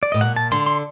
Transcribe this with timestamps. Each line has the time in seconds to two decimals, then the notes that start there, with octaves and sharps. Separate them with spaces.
0.03 D5
0.12 A2 D#5
0.21 A#2 F#5
0.36 A5
0.52 D3 C6
0.66 C6